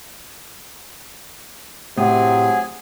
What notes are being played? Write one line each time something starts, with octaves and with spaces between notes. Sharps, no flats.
A2 C3 F#3 G#4 G#5